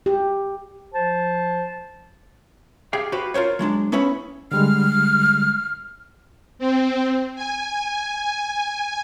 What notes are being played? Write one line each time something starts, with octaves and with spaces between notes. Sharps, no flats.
G4
F3 C5 A5
G4 G#4 F5 G5
F#4 G4 B4 C5 F5
F4 A#4 C5 C#5
F#3 G#3 C4 D4
B3 C#4 E4 C#5 B5
D3 G3 G#3 F6
C4
G#5